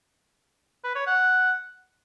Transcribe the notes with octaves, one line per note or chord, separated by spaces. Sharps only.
B4
C#5
F#5